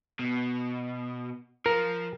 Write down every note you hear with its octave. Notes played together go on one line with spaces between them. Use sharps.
B2
F3 A#4